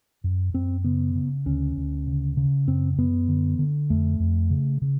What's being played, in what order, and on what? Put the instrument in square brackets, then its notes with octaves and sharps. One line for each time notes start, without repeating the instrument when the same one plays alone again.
[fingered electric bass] F#2
F#2 C4
C#3 B3
C#3
D2 C#4
D2
C#3
C#3
F#2 C4
F#2 B3
D3
D3
F2 A3
F2
C#3
C#3